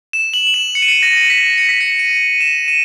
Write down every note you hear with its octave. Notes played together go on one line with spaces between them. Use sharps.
E7
F#7
F#7
E7
C#7
D#7
C#7
A#6
B6
C#7
B6
C#7
D#7
E7
D#7